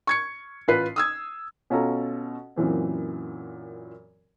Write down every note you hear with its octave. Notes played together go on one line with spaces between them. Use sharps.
C#6 G#6 C#7
A1 F4 B4 C7
D#6 E6 G#6
B2 C#4 F4 A4 A#5
F#2 A#2 E3 C4